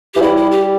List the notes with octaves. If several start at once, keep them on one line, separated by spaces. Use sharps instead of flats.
E3 G4
G3 E4
E4
G4